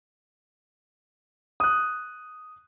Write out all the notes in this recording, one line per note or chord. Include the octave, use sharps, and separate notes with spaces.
D#6 F#6